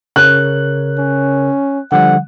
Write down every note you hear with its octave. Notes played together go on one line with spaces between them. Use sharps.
C#3 A#4 C#5 F#6
C#4
D3 F3 G3 F#5